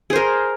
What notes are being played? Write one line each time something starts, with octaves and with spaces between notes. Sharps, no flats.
G#4 A#4 C5